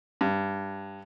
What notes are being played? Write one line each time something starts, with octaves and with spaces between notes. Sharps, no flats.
G2